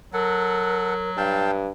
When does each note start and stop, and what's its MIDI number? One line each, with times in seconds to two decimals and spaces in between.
0.13 1.67 54
0.13 0.94 69
0.13 1.10 70
0.13 0.94 78
1.17 1.70 43
1.17 1.51 77
1.17 1.51 79
1.17 1.51 81